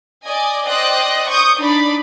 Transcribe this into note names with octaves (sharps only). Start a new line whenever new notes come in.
D5 D#5 G#5
C5 D5 D#5 G5 F#6
C#6 D#6 G6
D4 D#4 D5 B5